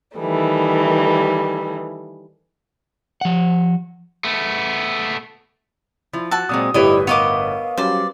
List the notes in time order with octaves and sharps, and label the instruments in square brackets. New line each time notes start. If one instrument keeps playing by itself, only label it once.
[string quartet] D#3 E3 G3 A3
[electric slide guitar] F3 F#5
[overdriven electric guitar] A3 B3
[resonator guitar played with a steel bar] F3 [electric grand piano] E4
[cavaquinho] F#4 A5 [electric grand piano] E6
[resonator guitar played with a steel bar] A#2 F#3 G#3 [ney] C4 [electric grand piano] D#6
[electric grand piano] G1 A2 B4 [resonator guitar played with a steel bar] G3 E4 C#5 [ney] G4 [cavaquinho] D#5
[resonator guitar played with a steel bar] B3 A#4 [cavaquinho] C#5 D#5 D6 [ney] F5
[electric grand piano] F#3 G3 C#4 [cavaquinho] C5 D5